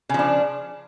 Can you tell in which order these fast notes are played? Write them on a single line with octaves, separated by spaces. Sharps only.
C#3 F3 D4